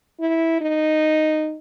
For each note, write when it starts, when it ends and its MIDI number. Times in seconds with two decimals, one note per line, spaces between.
0.20 0.58 64
0.61 1.57 63